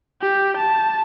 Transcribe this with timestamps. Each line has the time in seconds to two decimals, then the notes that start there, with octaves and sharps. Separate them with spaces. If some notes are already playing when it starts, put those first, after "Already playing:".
0.21 G4
0.57 A5